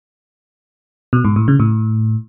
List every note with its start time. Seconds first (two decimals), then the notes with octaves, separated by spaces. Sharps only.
1.13 B2
1.24 G#2
1.36 A2
1.48 C#3
1.60 A2